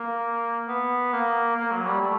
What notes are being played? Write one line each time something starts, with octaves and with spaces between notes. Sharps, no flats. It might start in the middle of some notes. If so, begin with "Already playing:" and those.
Already playing: A#3
B3
A#3
A#3
F#3
G3
A3